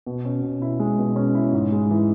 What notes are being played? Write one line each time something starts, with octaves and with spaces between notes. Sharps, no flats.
B2
C#4
B2
E4
G#3
B2
C#4
E4
G#2
G#3
E3